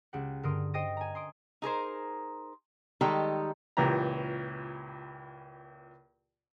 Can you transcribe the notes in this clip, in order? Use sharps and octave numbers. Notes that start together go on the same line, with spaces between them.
C#2 G4 F#5
G2 D3 A#4 C6 D#6 D7
C5 D#5 G5 D#6 A#6 D#7
G#5 A#5
C6 D#6 D7
D#4 G#4 A#4 C5
D#3 G3 G#3 D#4 G4 A4
C#2 A#2 E3 G4 A#5